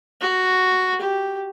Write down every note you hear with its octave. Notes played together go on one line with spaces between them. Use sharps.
F#4
G4